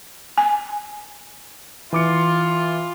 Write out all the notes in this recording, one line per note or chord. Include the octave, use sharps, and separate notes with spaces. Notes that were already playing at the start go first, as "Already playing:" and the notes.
G#5
E3 F4 D6 C#7